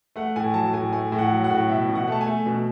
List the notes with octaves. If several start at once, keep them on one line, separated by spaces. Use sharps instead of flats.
A3 F#5
A2 G#5
F#3 A5
A2 G#5
A3 G#5
A2
F#5
F#3
F#5
A2
B2 E5
B2
F#5
A3 A5
G#5
A3
B2